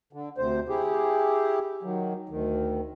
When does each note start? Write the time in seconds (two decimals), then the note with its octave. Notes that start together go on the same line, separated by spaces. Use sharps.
0.13 D3
0.38 D2 C3 C5
0.69 E4 G4 G#4
1.83 D#3 F#3
2.29 D2 D#3